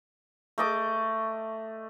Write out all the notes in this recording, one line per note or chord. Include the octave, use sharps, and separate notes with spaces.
A3 D#5 D6